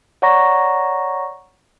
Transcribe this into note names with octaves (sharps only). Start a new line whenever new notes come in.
C#5 D5 F#5 A#5 C#6 A#6